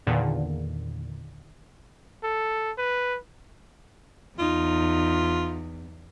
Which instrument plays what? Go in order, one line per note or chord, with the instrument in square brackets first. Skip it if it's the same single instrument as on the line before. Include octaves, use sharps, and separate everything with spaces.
[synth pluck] E2 A#2 D3 D#3
[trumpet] A4
B4
[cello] E2 [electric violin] D#4 [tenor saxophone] F4